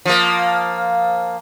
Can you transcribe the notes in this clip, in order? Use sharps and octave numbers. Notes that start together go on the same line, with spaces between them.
F3 A#3